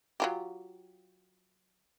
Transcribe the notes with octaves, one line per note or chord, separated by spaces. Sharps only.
F#3 F4 G4